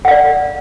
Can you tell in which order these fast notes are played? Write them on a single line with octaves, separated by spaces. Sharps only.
F#5 F5 D5